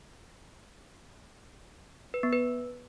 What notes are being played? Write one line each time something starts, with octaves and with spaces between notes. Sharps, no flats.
B4
B3
B4